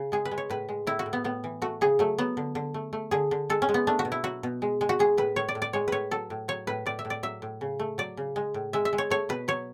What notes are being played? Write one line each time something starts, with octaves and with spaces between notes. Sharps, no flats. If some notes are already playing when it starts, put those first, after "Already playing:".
Already playing: C#3
G#3 G#4
B4
G#3
C#5
A2 B4
G#3
A2 E4
F#4
A2
B3
A2 B3
E3
A3 F#4
C#3 G#4
F#3 A3
F#3 B3
D3
D3
A3
A3
D3 G#4
D3
G#3 A4
C#4
G#3
B3
A3 D4
F#4
B2
E4
F#3 F#4
B2
G#3
G#3
F#4
G#3 G#4
A2 B4
A2 C#5
D5
A2
D5
G#3 C#5
A2 B4 C#5
F#3 A4
A2
F#3 C#5
A2 B4
A2 D5
E5
A2
D5
F#3 E5
A2
C#3
A3
F#3 D5
C#3
G#3
A2
G#3 E5
E5
G#3
C#5
A3 C#5
B2 B4
F#3 C#5